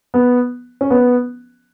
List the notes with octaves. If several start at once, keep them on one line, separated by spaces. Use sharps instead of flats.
B3
C#4
B3